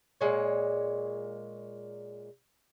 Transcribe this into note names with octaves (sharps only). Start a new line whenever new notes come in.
A#2 G#3 C#5